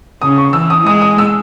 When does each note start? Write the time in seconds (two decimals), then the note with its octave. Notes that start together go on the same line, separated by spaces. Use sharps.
0.22 C#3 D#6
0.38 C#6
0.53 E3 E6
0.70 D#6
0.86 G#3 D#6
1.01 D#6
1.18 E6